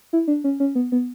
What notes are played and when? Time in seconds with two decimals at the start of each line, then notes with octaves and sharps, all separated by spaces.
0.13 E4
0.28 D4
0.44 C#4
0.60 C#4
0.75 B3
0.92 B3